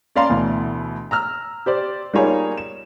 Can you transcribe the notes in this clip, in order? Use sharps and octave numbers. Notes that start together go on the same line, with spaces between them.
C#4 D5 F5 A#5 C6
D2 B2 E3
A#5 E6 F6
G4 C5 D5
G3 A#3 D#4 F4 G#4 C#5
E7